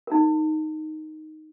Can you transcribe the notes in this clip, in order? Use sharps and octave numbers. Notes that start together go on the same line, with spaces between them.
D#4 A#4